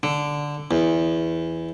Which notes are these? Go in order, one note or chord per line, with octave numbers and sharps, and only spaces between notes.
D3
E2